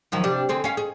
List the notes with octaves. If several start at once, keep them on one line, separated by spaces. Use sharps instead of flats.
D#3 F3 F#3
C3 G3 D4
D3 C4 G#4
C#4 F5
G#4